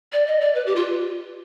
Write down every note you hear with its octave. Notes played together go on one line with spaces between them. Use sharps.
D5
D#5
D5
B4
G4
F4